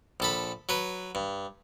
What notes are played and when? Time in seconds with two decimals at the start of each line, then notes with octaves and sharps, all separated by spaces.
0.20 A#1 A4 B5
0.69 F#3 B4
1.15 G2